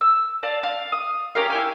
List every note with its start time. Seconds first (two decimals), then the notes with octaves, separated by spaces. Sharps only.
0.01 E6
0.43 D5 F5 A5
0.63 F5
0.92 D#6
1.35 C#4 G4 A#4 F5
1.50 E4 G5 G#5